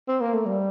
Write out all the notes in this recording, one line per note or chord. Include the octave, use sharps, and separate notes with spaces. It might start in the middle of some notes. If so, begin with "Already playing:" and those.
C4
A#3
A3
G3